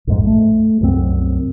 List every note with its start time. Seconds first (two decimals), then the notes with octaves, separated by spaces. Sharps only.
0.07 A#1 F2 G#2
0.27 A3
0.81 C2 F#2 E3 C4